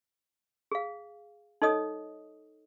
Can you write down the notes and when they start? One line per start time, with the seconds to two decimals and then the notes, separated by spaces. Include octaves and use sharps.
0.72 G#4 F5
1.62 D#4 A4 C#5 D#5 D#6